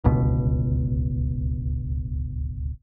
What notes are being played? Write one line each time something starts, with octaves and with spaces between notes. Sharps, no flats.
D1 G1 C#2 B2